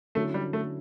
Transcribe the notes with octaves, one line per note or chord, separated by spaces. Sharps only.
D3 F#3 A3 C#4 E4
G3
A3